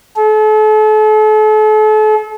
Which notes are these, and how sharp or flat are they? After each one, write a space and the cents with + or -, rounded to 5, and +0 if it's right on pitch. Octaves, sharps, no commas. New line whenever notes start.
A4 -40